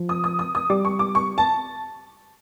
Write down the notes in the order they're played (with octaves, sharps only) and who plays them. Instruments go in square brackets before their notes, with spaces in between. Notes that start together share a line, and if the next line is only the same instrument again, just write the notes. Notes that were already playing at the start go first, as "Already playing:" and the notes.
Already playing: [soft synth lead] F3
[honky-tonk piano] D#6
D#6
D#6
D#6
[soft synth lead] G3 [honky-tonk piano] D6
[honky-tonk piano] C#6
D6
C#6
A5